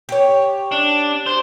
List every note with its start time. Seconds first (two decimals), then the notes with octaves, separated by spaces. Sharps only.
0.09 G4 C#5
0.72 D4
1.26 C5